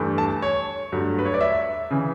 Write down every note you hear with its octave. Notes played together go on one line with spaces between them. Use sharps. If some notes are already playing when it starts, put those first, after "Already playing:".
Already playing: G2 E3 A3
A5
C#5
G2 F#3 A3
B4
C#5
D5
E5
C#3 E3